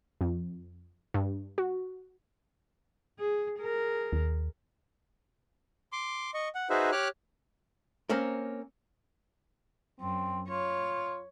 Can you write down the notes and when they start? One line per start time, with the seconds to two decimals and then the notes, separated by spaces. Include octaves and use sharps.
0.21 F2
1.14 G2
1.58 F#4
3.19 G#4
3.58 G#4 A#4
4.13 D#2
5.92 C6 D6
6.34 D#5 C#6
6.55 F#5
6.70 D#4 F#4 G#4 B4 C5 E5
6.92 G4 C#5 D6 F6 F#6
8.10 A#3 C4 C#4 A#4
10.00 F#2 C4
10.49 F4 C#5